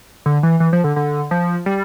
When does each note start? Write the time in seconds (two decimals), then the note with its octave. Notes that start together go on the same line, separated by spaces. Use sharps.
0.26 D3
0.43 E3
0.60 E3
0.73 F3
0.84 D3
0.96 D3
1.31 F3
1.66 G3